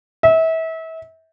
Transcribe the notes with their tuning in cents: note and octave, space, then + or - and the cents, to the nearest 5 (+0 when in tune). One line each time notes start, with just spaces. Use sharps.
E5 -30